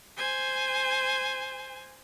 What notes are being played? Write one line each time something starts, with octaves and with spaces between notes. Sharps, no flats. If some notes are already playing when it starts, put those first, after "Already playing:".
C5 G#5